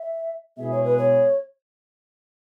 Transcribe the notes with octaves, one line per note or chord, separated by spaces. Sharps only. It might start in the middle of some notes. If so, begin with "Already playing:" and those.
Already playing: E5
B2 G#3 E4 G#4 E5
C#5
B4
C#5